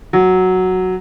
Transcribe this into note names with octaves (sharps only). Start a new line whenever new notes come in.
F#3